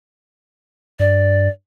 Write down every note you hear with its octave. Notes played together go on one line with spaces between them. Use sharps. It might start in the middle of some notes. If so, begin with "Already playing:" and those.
G2 D5